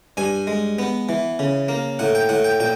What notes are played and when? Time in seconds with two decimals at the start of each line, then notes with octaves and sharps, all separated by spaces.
0.17 G2 G#5
0.47 G#3
0.79 B3
1.09 E3
1.39 C#3
1.68 A#3
1.99 A2 F#5
2.15 G5
2.29 A2 F#5
2.44 G5
2.60 A#2 G5